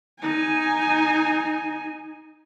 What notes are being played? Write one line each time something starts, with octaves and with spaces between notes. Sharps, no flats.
D#4 G#5